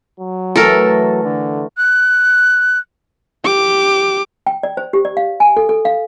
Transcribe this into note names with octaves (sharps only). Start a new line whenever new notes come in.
F#3
E3 A3 A4 A#4
D3
F#6
G4 D6
G5
D5
C5
G4
D5
F5
G#5
A4
A4
F5